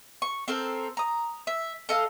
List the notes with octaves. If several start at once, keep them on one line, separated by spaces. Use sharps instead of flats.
C#6
C4 A4 A#4 C5
A#5 D#6
E5
A4 D#5 F5